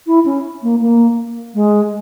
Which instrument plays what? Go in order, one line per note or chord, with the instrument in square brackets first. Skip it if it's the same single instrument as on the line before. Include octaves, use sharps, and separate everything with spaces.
[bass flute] E4
C#4
A#3
A#3
G#3